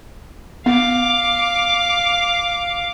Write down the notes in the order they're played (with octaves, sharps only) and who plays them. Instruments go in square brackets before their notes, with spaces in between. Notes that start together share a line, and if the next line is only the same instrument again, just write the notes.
[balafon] B3 [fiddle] F5 D6